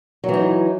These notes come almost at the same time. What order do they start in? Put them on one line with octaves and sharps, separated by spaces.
F#3 E3 D#4